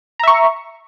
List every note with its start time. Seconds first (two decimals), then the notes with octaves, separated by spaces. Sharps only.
0.19 A#5
0.23 E5
0.27 C#6